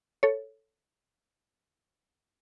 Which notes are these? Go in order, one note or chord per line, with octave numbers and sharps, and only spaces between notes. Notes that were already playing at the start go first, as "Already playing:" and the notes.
A4 C#5